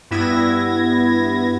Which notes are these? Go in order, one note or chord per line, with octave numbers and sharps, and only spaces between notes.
G2 B3 E4 G#6 A#6